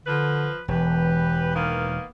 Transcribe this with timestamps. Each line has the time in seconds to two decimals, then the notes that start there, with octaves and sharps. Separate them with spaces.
0.06 D3 F3 B4
0.68 E1 E3 G4 B4
1.54 D#3 A#3 B3